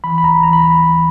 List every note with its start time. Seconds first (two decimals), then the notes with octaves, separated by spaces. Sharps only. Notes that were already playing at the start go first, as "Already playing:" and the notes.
0.04 E3 B5
0.18 B5
0.23 D2 A#5
0.43 E3 A#5
0.53 B5